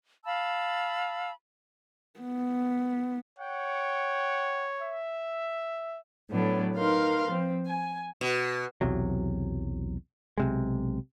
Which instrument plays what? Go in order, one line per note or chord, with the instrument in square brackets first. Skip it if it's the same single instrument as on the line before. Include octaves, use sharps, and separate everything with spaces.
[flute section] F5 A5 B5 E6
[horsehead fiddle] B3
[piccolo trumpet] C#5 [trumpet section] F#5 G5
[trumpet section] E5
[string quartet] A2 F#3 A3 B3 D4
D#4 A#4 B4 F5 C6
F3 C4
G#5
[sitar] B2
[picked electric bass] B1 E2 C3 F#3
B1 C3 G#3